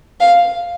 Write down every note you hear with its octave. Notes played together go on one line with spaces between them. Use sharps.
F5